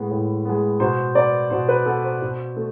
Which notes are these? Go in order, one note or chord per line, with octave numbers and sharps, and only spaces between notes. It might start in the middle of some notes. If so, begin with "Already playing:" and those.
Already playing: A2 G#3 B3
A2
G#3 B3
B2 C5
B3 D5
B2 C5
B4
B3 A4
C5
B2
A3